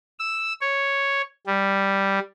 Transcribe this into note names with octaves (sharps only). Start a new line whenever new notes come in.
E6
C#5
G3